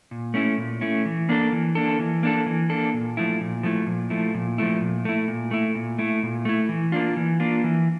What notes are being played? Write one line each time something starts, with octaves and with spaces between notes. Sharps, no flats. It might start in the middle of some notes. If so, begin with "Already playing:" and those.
A#2
A3 C#4 E4
A#2
A3 C#4 E4
E3
A#3 D4 A4
E3
A#3 D4 A4
E3
A#3 D4 A4
E3
A#3 D4 A4
A#2
F3 A3 E4
A#2
F3 A3 E4
A#2
F3 A3 E4
A#2
F3 A3 E4
A#2
A3 E4
A#2
A3 E4
A#2
A3 E4
A#2
A3 E4
E3
A#3 D4 F4
E3
A#3 D4 F4
E3